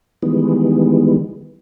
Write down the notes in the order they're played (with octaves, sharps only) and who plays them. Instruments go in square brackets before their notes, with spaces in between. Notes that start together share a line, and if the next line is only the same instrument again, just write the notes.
[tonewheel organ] D#3 E3 G3 G#3 B3